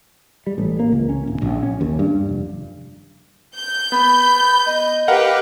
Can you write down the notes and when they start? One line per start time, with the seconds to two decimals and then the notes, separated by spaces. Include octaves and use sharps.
0.47 G3
0.58 A1
0.80 A#3
0.92 C#2
1.09 C#4
1.27 D1
1.42 A#1
1.63 C#4
1.81 D#2
1.99 G2
2.29 F1
3.58 G6
3.92 B3 B5
4.66 D#5
5.08 G4 A#4 B4 F5 F#5